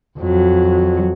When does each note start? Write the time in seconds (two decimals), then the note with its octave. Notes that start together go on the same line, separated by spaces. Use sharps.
0.19 F2 F#3